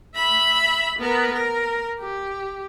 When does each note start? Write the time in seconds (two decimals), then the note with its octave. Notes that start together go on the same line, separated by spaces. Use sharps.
0.15 E5 B5
0.98 B3 A#4
1.33 A#4
2.00 G4